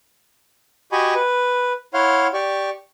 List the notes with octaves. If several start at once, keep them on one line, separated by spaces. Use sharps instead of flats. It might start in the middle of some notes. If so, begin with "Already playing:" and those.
F#4 G4 D#5 G#5 B5 C#6
B4
E4 C#5 F5 F#5 C6 F6
G4 D5 C#6